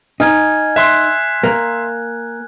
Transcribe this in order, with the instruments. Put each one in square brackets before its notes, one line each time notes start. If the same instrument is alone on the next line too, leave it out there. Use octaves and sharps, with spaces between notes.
[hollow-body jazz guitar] D#4 [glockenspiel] G#5 F6 G#6
[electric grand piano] E5 C6 [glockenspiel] F#6
[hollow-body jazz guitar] A#3